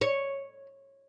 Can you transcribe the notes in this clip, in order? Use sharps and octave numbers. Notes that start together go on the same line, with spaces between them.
C#5